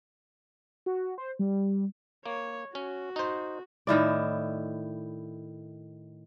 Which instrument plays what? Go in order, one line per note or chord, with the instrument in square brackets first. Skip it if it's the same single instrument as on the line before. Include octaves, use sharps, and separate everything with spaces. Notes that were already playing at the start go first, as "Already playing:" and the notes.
[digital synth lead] F#4
C5
G3
[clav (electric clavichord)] A#3 [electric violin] C#5
[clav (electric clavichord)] C#4 [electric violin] F#4
[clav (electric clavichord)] D#4 C5
[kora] A2 D#3 E4 D5